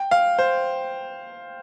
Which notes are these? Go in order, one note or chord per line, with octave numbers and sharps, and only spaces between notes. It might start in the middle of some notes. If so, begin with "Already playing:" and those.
Already playing: G5
F5
C5